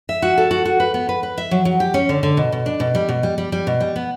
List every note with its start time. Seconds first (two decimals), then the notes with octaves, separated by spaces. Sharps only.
0.09 E5
0.22 F#4
0.38 A4
0.51 F#4
0.65 F#4
0.80 B4
0.94 B3
1.09 B4
1.23 B4
1.38 E5
1.51 F#3
1.65 F#3
1.80 G4
1.94 C#4
2.09 D3
2.23 D3
2.37 B2
2.52 B2
2.66 D4
2.80 B2
2.95 G3
3.09 B2
3.23 G3
3.38 G3
3.52 G3
3.67 B2
3.81 G3
3.96 B3